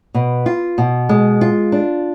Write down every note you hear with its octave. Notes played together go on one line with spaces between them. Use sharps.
B2
F4
B2
G#3
F4
D4